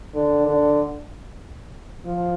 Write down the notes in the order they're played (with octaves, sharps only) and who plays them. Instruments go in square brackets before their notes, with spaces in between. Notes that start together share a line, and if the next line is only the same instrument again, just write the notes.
[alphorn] D3
D3
F3